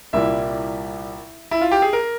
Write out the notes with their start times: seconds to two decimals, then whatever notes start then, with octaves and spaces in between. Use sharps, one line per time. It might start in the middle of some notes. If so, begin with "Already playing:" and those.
0.13 C2 A#2 G3 A#3 E4 E5
1.51 E4
1.61 F4
1.71 G4
1.82 G#4
1.93 A#4